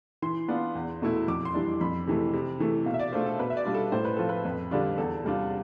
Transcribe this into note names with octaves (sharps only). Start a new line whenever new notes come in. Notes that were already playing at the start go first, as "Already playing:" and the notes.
E3 C6
B3 D4 F4
E2
B2 A3 E4
F2 D6
C6
E3 G3 D4
F2 B5
C3 E3 A3
C3
E3 A3
B2 F5
E5
D5
A3 D4 F4 C5
A4
B2 B4
E5
D5
G3 D4 F4
A4
A2 C5
B4
F3 C4 F4 A4
B4
F2
D3 G3 D4 F4
E2 A4
C3 G3 D4 F4